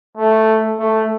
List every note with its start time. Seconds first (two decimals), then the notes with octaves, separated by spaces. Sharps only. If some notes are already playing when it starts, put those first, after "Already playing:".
0.17 A3
0.79 A3